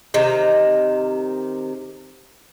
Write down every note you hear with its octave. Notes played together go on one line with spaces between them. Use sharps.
C3 D#3